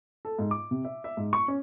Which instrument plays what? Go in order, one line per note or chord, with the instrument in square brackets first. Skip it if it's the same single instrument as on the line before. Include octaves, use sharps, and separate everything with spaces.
[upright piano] A4
G#2
D6
C3
E5
E5
G#2
C#6
C#4